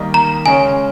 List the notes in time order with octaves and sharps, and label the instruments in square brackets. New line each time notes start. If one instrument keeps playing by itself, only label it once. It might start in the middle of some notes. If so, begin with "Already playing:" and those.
Already playing: [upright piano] D#3 G3 A#3 D#4
[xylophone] A#5
[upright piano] C#3 G#3 C#4 [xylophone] G#5